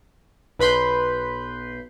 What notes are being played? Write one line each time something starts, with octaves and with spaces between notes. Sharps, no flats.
B1 B4 B5 C6 G6